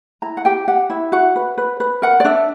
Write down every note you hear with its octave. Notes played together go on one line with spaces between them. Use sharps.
E4 A#5
F#5
G4 G5
G4 F#5
E4 E5
F#4 F#5
B4
B4
B4
A#4 F#5
D5
D4 E5